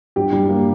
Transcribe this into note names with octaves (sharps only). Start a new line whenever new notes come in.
G2 G4
G3
A#3